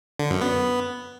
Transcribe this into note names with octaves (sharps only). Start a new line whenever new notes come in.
D3
F#2
B3